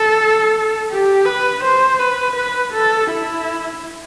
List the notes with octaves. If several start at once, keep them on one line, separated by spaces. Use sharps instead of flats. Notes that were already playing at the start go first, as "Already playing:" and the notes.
Already playing: A4
G4
B4
C5
B4
B4
A4
E4